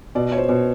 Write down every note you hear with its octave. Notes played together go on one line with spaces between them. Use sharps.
B2 D5
C#5
C5
B2